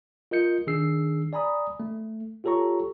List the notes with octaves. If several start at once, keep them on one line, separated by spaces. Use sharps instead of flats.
F4 A#4 D#5 G6 C#7
D#3 D4 G#4 E6 C7
D5 G#5 A#5 B5 D#6
A3
F4 G4 A4 C#5 A#5 C#6